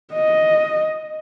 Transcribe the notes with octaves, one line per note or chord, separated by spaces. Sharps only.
D#5